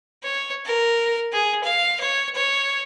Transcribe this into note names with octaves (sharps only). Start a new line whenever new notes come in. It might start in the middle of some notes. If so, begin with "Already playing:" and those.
C#5
A#4
G#4
F5
C#5
C#5